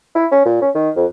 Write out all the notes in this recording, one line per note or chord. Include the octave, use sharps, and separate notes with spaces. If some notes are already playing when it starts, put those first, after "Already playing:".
E4
C#4
A#2
C#4
D#3
F2